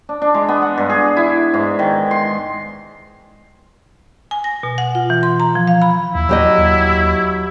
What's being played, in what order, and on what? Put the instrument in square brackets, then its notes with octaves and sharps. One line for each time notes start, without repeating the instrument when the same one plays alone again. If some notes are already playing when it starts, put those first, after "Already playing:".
[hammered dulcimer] D4
D4
G#3
B3
F#5
G2
G#4
E4
G#2
D#3
C6
[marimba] G#5
A#6
B2
F#5
F4
E3
C6
A#5
F3
F5
B5
[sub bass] D#2 [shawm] E4
[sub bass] D#2 [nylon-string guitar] F#3 G4 D#5
[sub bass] D#2